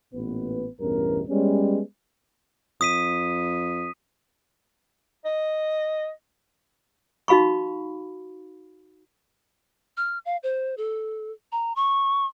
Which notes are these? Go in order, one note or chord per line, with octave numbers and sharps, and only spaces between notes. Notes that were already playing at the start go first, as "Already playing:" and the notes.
A1 A#2 B3 B4
A1 E2 G2 B2 C#4 A#4
G3 G#3 B3 C#4
F2 D#6 B6 D#7
D#5
D#4 F#4 F5 B5 C#6
F6
F5
C5
A4
A#5
C#6